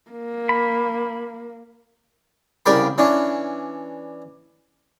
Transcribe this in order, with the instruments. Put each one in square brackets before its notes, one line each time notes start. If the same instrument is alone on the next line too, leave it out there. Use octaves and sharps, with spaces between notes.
[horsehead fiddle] A#3
[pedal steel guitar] B5
[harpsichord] C2 C#3 A#4 D5 G5 B5
E3 C#4 D4